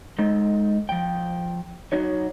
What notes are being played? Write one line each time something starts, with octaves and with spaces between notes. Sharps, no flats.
G#3 D#4 A4
F3 G5
F#3 D#4 F#4 C#5